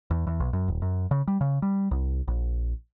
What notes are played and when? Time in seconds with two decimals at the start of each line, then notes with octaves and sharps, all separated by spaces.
0.11 E2
0.27 E2
0.40 B1
0.53 F#2
0.68 D#1
0.82 F#2
1.11 C#3
1.28 G3
1.41 C#3
1.62 G3
1.91 C2
2.28 A#1